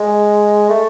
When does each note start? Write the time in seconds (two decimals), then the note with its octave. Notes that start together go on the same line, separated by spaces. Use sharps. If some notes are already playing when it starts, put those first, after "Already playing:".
Already playing: G#3
0.70 A3